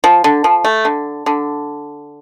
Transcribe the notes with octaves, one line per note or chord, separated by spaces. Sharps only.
F3
D3
F3
A3
D3
D3